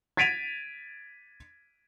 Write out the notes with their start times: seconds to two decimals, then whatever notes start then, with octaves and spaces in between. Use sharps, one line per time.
0.17 G#6 A6 B6 D7 D#7 F7